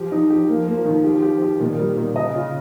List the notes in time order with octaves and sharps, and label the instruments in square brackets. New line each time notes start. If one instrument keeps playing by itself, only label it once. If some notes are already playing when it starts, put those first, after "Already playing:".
Already playing: [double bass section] F3 [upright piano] G4
[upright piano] D#4
G4
[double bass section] F3 [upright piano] A#3
[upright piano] A#3
D#3
G4
G4
G4
[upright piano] A#2 [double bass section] D#3
[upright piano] G3
A#2
[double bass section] C#3 [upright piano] D#5
[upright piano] F4